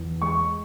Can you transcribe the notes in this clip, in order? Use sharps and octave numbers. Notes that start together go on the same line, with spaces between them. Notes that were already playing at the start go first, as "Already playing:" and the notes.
Already playing: E2
G#3 C#6